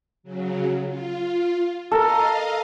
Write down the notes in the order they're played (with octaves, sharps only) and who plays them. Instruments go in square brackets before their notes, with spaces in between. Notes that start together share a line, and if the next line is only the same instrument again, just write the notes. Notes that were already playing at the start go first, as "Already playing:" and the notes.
[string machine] C#3 F#3
F4
[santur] A4 A#4 [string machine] D#5 F5